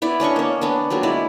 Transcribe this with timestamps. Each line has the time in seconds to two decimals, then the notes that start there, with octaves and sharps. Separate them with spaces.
0.02 B3 E4 D5
0.20 C#4 D4 D#5 C#6
0.36 A#3 C#4
0.61 B3 C#4 D4
0.90 F#3 G3 A#3 F4
1.03 G#3 E4 D5